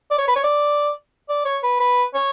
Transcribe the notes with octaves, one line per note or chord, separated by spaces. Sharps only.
D5
C#5
B4
C#5
D5
D5
C#5
B4
B4
C#5